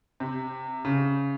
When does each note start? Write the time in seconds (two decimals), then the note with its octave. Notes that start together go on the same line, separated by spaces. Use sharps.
0.20 C3
0.85 C#3